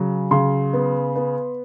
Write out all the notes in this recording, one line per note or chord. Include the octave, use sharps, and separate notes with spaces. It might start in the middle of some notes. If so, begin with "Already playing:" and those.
Already playing: C#3 F#3
C#3 C6
B3
B3